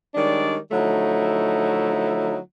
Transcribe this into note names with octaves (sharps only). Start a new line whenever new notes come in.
D#3 G3 G#3 D4 C#5 D5
D3 F3 F#3 A3 D#4 E4